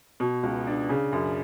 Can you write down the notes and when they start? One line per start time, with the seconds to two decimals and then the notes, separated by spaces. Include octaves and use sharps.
0.20 B2
0.43 C#2
0.67 D4
0.89 C#3
1.12 F#2